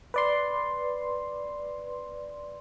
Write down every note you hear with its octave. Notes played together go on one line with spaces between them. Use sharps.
B4 D5 C6